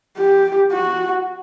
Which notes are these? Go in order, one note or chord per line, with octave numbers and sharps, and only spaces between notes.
G4
F#4